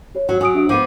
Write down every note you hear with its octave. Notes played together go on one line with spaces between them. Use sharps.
G4 C#5
F#3
F#3 G#5 D#6 D7
D4 G4 E5
F3 B3 G4 D6 D#7